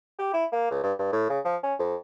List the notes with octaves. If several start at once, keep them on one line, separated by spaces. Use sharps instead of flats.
G4
E4
A#3
C#2
G2
G2
A2
C#3
F3
C#4
F2